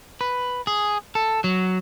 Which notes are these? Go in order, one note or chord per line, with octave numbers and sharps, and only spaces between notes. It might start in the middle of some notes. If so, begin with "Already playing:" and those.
B4
G#4
A4
F#3